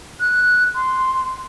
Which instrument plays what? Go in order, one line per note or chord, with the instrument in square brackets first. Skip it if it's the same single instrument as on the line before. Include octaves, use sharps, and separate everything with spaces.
[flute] F#6
C6